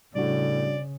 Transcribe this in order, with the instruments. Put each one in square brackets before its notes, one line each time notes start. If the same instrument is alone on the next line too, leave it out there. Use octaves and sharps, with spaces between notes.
[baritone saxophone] A2 [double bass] C#3 [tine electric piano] G3 D4 F#4 [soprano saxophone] D5